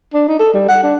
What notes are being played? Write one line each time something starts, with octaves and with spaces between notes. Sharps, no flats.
D4
D#4
A4
G3
F#5
D4